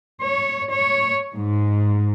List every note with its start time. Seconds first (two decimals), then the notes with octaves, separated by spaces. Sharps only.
0.22 C#5
0.72 C#5
1.33 G#2